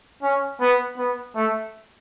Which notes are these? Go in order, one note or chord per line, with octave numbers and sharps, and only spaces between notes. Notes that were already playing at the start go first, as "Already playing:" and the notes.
C#4
B3
B3
A3